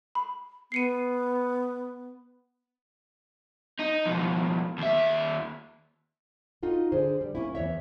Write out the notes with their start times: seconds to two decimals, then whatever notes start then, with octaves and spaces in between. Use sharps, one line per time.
0.15 B5
0.72 B3 C7 C#7 D#7
3.79 D#4
4.06 F2 B2
4.78 D#2 E5
6.63 D#4 F4 F#4 A4
6.92 D3 G#4 C5
7.21 G3
7.35 A#3 C#4 E4
7.55 E2 E3 C#5 E5